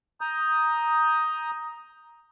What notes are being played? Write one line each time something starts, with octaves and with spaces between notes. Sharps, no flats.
A#5 D#6 G6